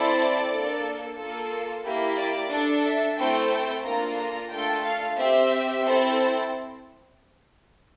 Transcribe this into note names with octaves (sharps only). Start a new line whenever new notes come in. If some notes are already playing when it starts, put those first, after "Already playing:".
Already playing: C4 E4 A4 D5
A#3 D4 A4
A#3 F4 A4
A#3 E4 G4
D5
D4 A4
E5
A3 C4 E4 A4 G5
G5
A#3 D4 F4 A4 A#5
A#5
A3 D4 F4 A4 G5
F5
C4 G4 E5
C4 E4 A4